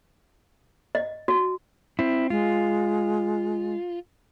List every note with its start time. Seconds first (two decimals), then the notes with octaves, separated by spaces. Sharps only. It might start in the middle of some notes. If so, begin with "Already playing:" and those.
0.95 D#5
1.28 F#4
1.99 C4 E4
2.30 G#3 F4